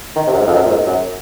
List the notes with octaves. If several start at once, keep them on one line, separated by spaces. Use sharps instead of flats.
D#3
C3
F#2
G#2
F2
F#2
A#2
G#2
F#2